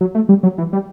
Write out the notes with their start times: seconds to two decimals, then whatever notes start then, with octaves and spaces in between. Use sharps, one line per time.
0.01 F#3
0.15 A3
0.29 G3
0.43 F#3
0.58 E3
0.73 G3